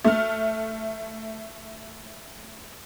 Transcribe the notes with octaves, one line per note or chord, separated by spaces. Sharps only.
A3 F6